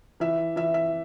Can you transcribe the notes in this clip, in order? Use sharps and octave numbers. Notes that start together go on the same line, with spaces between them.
E3 E5
E3 E5
E5